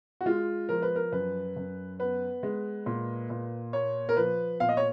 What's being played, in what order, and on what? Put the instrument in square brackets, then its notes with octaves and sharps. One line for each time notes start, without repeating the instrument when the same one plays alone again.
[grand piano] F#4
G#3 F4
F3 A#4
B4
A#4
F#2 B4
F#2
B3 B4
G#3
A#2
A#2
A#3 C#5
A#4
F3 B4
A#2 F5
D#5
C#5